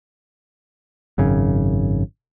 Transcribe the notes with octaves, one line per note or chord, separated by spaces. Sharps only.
G#1 F#2 C#3